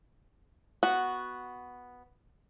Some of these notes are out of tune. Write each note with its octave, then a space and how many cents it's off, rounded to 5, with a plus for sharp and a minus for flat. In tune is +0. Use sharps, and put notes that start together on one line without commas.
B3 +0 F#4 +0